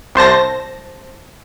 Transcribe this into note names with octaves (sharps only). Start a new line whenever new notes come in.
C2 C5 A5 A#6